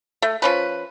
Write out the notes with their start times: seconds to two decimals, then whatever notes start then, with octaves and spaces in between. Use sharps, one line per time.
0.22 A3
0.42 F3 C#4 B4